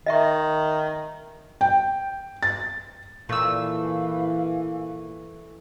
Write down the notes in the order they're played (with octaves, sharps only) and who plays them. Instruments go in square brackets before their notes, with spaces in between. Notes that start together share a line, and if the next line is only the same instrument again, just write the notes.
[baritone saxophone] D#3 [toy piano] D#5 E5 C#6
[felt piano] G5
A6
[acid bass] A#2 [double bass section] E3 [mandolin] A3 E6 [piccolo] F5